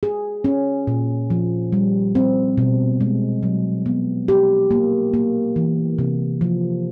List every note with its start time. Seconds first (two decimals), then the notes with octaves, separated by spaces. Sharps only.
0.03 G#4
0.44 C#4
0.87 A#2
1.30 F3
1.72 G3
2.15 C4
2.58 B2
3.01 G#3
3.43 F#3
3.86 B3
4.28 G4
4.71 A#3
5.14 A#3
5.56 E3
5.99 C3
6.41 F3